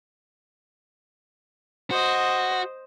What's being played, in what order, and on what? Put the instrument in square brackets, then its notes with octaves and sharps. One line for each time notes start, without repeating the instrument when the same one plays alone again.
[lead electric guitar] F#4 [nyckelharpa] C5 D#5